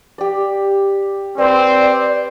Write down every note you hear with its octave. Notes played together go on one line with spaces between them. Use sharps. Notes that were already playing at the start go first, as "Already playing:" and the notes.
G4 D5
C4 B4 D5 B5